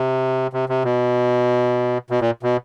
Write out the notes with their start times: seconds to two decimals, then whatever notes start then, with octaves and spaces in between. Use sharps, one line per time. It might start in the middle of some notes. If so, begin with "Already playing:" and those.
Already playing: C3
0.53 C3
0.69 C3
0.84 B2
2.10 B2
2.21 A#2
2.43 B2